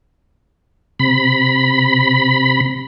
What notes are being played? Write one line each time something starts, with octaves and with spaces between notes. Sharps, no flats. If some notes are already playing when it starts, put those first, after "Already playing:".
C3 B5